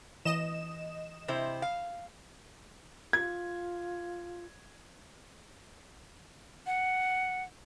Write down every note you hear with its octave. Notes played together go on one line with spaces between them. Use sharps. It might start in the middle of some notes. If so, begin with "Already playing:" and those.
E3 D#5 E7
C3 E4 C5
F5
F4 G#6
F#5